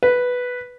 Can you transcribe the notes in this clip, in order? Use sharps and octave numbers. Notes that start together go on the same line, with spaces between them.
B4